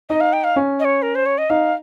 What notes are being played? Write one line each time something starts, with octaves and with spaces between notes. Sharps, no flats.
D#4 D#5
F5
G5
F5
C#4
D#5
C#5
A#4
C5
C#5
D#5
D#4 F5